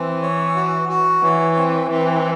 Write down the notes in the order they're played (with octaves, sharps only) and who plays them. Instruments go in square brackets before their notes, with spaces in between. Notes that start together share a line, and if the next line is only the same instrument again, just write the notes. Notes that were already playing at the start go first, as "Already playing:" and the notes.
Already playing: [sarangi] E3 [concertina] C4
[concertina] C#5
F#4
F#4
[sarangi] E3 [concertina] C#5
[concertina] C4
[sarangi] E3 [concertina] C4